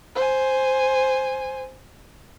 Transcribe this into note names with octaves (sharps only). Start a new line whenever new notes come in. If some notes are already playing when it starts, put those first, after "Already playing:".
C5 G#5